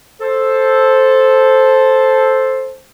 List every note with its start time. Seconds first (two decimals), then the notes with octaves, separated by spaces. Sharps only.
0.21 A4 C5